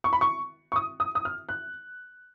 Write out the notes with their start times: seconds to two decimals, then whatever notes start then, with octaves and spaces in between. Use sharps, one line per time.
0.04 C#6
0.13 B5
0.21 C#6
0.72 C#6
0.76 D#6
1.00 D#6
1.15 D#6
1.25 F6
1.49 F#6